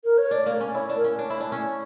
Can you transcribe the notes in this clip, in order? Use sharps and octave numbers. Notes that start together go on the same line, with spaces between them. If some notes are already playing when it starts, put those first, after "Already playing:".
A#4
C#5
D4 D5
A#3
C#4
E4 C#5
D4
A#4
C#4
D4 C#5
E4
D4
C#4